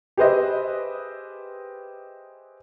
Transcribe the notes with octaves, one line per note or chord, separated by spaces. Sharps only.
G4 G#4 B4 C5 D#5 E5